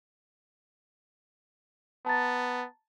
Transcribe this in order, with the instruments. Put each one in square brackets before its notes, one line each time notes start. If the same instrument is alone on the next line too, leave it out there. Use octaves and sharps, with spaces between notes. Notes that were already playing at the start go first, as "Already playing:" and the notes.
[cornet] B3 [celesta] A5 A#5 A6